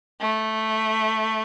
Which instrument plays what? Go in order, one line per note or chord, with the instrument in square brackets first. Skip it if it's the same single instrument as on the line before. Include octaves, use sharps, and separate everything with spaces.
[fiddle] A3